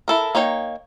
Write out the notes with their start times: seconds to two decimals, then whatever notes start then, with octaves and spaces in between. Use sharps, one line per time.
0.08 E4 A4 A#4
0.35 A#3 D#4 C#5 G5